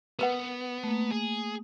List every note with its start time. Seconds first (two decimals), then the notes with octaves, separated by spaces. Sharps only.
0.19 B3 A#4 B4 F#5
0.83 A3 A#3
1.11 G#4